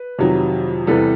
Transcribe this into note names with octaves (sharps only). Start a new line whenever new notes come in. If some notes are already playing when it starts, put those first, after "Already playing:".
Already playing: B4
F2 C3 D#3 F#3
E2 C3 E3 G3 A4 B4